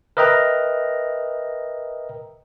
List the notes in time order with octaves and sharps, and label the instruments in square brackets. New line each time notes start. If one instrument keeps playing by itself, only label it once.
[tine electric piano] A#4 B4 D#5 E5 G5 A#5